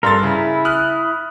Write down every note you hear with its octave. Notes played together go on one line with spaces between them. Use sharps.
G2 A4 A#4 C6 A6
C#3 E4
D#6 F6 F#6